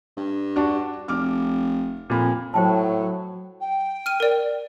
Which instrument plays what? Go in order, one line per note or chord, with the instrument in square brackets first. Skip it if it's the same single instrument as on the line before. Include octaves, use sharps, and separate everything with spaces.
[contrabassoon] G2
[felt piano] D4 F#4
[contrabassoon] F1 [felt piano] D6 F6
[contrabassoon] F2 [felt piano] A#2 B5
[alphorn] A2 [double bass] F#3 [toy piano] C5 G5 A5
[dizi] G5
[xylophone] F6 D#7
A#4 D5